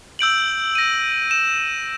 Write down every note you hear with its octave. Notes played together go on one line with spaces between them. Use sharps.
E6 G6 D7 F#7
A#6 D#7
E7